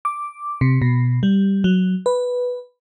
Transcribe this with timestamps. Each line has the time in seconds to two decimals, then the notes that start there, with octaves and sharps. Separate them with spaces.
0.05 D6
0.61 C3
0.82 B2
1.23 G3
1.64 F#3
2.06 B4